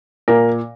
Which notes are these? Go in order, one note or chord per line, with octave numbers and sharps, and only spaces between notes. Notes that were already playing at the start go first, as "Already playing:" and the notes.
A#2 A#4